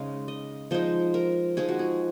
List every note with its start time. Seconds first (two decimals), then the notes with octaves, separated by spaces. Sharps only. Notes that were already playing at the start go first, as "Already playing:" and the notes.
Already playing: C#3 G#3 D#4 D#5 F5
0.28 D#5
0.71 F3 G#3 D#4 C5
1.14 A#4
1.57 F3 G#3 D#4 G#4
1.69 F#4
1.79 G#4